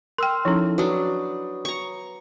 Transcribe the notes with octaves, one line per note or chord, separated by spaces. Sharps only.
A#4 G5 C6 E6 F6
F3 C#4 D#4 E4 A4
F#3 D4 B4 C#5 D#6
A#5 C#6